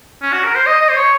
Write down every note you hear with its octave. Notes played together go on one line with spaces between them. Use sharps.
C#4
F#4
A#4
C5
D#5
D#5
C5
C#5